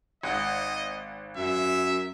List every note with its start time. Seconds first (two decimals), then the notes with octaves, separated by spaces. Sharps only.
0.23 G#1 D#5 F#5
1.37 F#2 E5